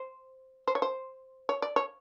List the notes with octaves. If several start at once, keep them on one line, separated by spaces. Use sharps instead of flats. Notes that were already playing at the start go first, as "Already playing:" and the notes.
Already playing: C5
C5
C#5
C5
C#5
D5
C#5